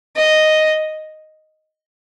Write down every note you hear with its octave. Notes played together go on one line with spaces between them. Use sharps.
D#5